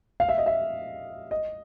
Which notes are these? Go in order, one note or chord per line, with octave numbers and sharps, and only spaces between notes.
F5
E5
D#5
E5
D#5